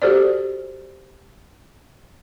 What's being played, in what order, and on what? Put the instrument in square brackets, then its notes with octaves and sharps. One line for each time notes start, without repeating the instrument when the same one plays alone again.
[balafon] F#4 G4 A4 C5 D5